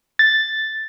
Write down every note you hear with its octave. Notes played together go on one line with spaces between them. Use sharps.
A6